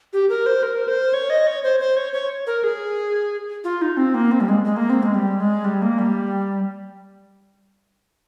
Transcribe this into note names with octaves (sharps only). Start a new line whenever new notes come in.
G4
A#4
C5
A#4
C5
C#5
D#5
C#5
C5
C5
C#5
C#5
A#4
G#4
F4
D#4
C4
A#3
C4
G3
G#3
G#3
A#3
C4
G#3
G3
G#3
G3
A#3
G3